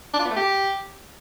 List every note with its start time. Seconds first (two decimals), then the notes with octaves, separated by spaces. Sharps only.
0.14 D4
0.19 F4
0.25 B3
0.30 A3
0.36 G4